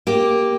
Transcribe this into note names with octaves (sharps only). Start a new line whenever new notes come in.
A#3 G4